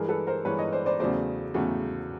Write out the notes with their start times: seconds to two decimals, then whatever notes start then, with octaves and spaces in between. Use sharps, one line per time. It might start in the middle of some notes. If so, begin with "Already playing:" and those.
Already playing: G2 E3 G#3 G#4 A#4
0.08 A4 B4
0.27 A#4 C5
0.45 G2 E3 G#3 B4 C#5
0.59 C#5 D#5
0.72 C5 D5
0.86 C5 D5
1.00 E2 C#3 F#3 A3 C5 D5
1.54 E2 C#3 F#3 A3